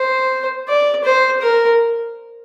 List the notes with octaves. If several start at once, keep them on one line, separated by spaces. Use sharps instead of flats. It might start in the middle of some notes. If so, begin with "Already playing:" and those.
Already playing: C5
D5
C5
A#4